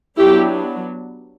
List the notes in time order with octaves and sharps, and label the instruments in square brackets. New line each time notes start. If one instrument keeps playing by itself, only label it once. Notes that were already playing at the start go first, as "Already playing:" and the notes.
[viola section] F#3 B3 D4 E4 G4